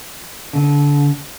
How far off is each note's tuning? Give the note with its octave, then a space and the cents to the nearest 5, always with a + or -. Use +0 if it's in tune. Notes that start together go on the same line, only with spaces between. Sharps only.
D3 -30